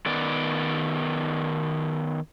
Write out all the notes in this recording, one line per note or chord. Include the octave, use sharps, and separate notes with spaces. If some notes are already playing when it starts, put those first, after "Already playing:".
D#3 B3 D5